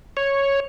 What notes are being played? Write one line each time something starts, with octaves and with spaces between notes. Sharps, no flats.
C#5